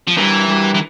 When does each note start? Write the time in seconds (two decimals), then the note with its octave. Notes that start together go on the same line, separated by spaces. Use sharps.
0.08 F3
0.17 E3 G3 D4 G4 A#4
0.48 G3 D4 G4 A#4
0.74 E3